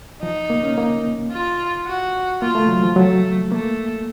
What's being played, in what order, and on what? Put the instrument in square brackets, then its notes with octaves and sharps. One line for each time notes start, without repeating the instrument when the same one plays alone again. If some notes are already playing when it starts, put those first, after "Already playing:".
[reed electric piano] F3 [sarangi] D#4
[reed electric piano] A#3
C#4
A#3
[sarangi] F4
F#4
[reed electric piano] A#3 [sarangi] F4
[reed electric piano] A3
F#3
F3
[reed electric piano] F#3 [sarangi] A3
[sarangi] A3 [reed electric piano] A#3